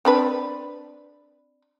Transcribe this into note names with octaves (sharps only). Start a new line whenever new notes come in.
C4 D4 B4